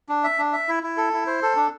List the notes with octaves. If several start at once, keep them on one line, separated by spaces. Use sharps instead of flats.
D4
E5
D4
E5
E4
E4
A4
E4
C5
A4
D4